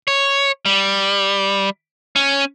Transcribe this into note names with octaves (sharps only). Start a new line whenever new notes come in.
C#5
G3
C#4